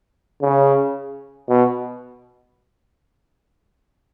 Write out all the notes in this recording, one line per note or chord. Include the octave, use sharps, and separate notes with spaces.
C#3
B2